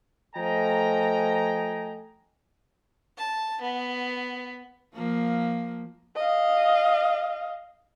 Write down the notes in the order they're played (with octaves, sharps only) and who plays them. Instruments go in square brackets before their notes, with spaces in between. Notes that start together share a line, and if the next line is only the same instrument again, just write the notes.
[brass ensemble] F3 A3 D#5 G5 G#5 A#5
[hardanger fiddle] A5
B3
[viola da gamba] F3 A#3
[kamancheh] D#5 F5